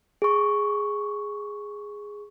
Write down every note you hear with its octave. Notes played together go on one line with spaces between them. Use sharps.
G#4 C#6